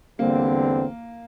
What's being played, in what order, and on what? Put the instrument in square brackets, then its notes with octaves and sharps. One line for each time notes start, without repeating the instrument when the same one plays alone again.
[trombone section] E2 D3 G3 C4 [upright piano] A#3